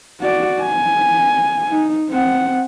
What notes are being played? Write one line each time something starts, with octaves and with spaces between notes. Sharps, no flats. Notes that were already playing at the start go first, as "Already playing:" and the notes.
F#4 D5
G#5
D#4
C4 F#5